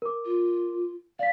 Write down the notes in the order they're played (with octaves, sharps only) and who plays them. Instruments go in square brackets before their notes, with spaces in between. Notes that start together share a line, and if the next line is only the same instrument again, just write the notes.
[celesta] A#4 D6
[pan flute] F4
[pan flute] D5 [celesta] F5 B6